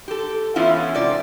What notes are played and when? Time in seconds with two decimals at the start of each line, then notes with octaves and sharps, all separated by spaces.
0.08 G4 A4
0.56 E3 B3 C#4 E4 F4
0.95 G#2 C3 D5